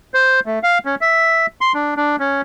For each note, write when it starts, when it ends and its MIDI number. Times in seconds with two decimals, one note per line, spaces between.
0.14 0.40 72
0.46 0.59 57
0.63 0.78 77
0.85 0.95 61
1.01 1.46 76
1.61 1.73 84
1.74 1.94 62
1.97 2.16 62
2.19 2.41 61